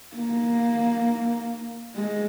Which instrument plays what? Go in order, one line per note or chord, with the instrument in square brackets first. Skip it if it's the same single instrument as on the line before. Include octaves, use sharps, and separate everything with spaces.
[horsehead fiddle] A#3
G#3